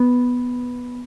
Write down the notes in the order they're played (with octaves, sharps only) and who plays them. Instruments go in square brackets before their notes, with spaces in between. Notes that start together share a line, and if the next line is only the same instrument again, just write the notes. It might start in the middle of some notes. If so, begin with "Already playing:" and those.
Already playing: [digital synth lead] B3